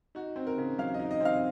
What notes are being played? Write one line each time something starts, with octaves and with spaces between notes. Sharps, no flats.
D#4 F#4
C4
A#4
C#3
F#3 F5
D#5
D#4
D#5
C4 F5